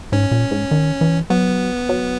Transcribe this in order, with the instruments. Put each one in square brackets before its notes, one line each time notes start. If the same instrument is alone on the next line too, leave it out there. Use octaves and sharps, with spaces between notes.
[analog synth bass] G#2 [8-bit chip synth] C#4
[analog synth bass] A#2
G#2
D#3
E3
[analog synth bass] F#3 [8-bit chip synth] B3
[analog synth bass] F#3